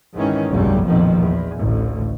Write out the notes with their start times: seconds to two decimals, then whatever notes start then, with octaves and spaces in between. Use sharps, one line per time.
0.14 G#2 D#3 E3 C#4
0.49 F1 B1 G2 C#3 F#3 G3
0.86 A#1 F2 B2 D#3 F3
1.17 E2
1.59 A1 D2